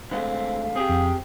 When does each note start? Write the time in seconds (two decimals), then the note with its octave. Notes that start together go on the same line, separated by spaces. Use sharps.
0.11 D3 G#3 A3 C4 F5
0.76 C4 G4 G#4
0.89 F2